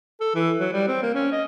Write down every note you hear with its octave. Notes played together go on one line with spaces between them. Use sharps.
A4
E3
F#3
G3
C4
A#3
C#4
D#5